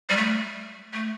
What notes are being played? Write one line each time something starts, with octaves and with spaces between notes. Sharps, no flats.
G3
A3
A3